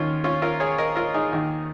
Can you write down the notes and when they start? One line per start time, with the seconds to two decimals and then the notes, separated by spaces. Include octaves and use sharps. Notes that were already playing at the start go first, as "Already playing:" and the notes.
Already playing: D#2 D#3 C#4 F4
0.24 C#4 F4
0.42 F4 A#4
0.60 G#4 C#5
0.78 A#4 D#5
0.96 F4 A#4
1.14 D#4 G#4
1.33 D#2 D#3